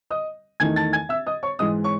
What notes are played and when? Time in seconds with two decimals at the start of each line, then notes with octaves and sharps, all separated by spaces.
0.10 D#5 D#6
0.60 E2 D#3 A3 D#4 G#5 G#6
0.76 A5 A6
0.93 G#5 G#6
1.09 E5 E6
1.26 D#5 D#6
1.43 C#5 C#6
1.59 G#2 E3 G#3 D#5 D#6
1.84 C#5 C#6